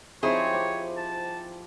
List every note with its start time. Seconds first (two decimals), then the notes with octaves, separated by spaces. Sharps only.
0.23 F3 C4 D#4 E4 G4 G#4 C#5
0.54 D6
0.97 A5